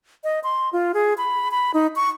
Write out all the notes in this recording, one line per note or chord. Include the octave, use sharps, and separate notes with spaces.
D#5
C6
F4
G#4
B5
B5
D#4
C#6